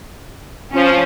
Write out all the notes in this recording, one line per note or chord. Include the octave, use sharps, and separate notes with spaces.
F3 C#4